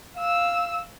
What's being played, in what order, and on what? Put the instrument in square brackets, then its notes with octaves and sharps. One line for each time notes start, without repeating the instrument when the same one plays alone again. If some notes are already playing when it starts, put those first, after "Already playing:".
[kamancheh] F5 E6